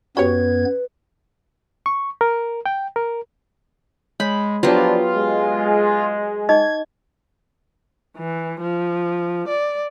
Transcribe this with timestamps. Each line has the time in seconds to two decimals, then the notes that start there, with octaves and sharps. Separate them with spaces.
0.17 F#2 B3 F#4 G4 B4 C#5 G#6
1.86 C#6
2.21 A#4
2.66 G5
2.96 A#4
4.20 G#3 C#5 B5
4.63 F3 F#3 B3 D4 F4 G4
5.15 G#3
6.49 D#4 G#4 D#5 G#6
8.17 E3
8.60 F3
9.48 D5